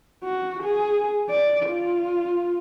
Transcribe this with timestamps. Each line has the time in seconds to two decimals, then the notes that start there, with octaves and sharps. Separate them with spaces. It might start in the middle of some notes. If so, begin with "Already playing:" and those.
0.24 F#4
0.64 G#4
1.30 D5
1.70 F4